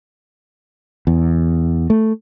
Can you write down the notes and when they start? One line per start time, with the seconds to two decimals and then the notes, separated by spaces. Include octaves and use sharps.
1.07 E2
1.90 A3